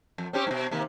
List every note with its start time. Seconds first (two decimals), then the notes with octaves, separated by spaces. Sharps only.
0.18 F2
0.33 C4 C#4 G4
0.47 G#2 B2
0.71 C3 D#3 A#3